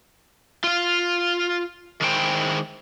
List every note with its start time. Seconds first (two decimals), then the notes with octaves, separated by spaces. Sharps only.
0.64 F4 F5
2.01 D#3 G#3 E4 C5 G5